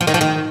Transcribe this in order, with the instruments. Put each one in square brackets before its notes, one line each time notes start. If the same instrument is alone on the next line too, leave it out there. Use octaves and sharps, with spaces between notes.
[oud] F3
D#3
F3
D#3